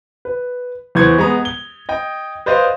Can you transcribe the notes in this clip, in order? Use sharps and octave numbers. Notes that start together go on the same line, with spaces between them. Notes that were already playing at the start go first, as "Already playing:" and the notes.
B4
E2 E3 B4 C5 C#6 G#6
G#3 B3 A#5
G7
D#5 G5
B4 C5 D5 D#5 F5 C6